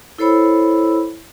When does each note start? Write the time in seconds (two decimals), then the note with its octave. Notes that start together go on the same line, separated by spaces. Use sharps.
0.18 E4 A4 C5 C#5 B5 E6